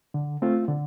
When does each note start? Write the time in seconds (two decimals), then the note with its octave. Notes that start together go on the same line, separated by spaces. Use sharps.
0.14 D3
0.42 A3 C4 F4
0.68 D3